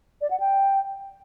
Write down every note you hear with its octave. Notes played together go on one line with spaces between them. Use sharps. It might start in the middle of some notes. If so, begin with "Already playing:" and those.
D5
F#5
G5